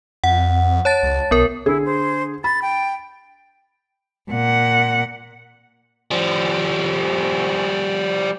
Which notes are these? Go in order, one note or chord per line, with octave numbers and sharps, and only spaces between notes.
F2 F#5
C#5 A5 A6
C#2
B1 B3 A#4
D3 E4 G#4
C5
B5 A6
G5
A#2 F#5
F3 G3